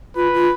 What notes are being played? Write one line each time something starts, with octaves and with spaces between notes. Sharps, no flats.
F4 B4
F4